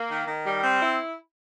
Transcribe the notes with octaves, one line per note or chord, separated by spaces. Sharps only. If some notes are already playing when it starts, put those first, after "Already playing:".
Already playing: A#3
D#3
D#3
G3
C4
E4